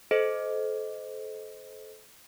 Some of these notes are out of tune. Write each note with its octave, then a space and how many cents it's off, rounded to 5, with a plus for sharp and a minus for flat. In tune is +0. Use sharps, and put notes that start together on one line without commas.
A4 -30 C5 -15 D#5 +0